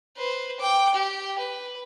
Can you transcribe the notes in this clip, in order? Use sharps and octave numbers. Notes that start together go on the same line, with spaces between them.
B4 C5
G5 D6
G4
B4